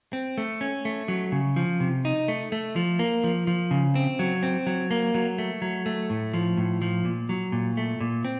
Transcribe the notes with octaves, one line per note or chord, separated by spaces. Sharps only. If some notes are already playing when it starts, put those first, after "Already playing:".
C4
A3
C#4
A3
F#3
C#3
F3
C3
D#4
A3
A3
F3
A#3
F3
F3
C#3
C4
F#3
C4
F#3
A#3
F#3
A3
F#3
A3
A2
F3
A2
F3
A#2
F#3
A#2
A3
A#2
C4